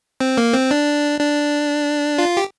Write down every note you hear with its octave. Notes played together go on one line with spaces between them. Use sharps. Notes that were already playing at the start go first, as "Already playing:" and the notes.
C4
A#3
C4
D4
D4
F4
G4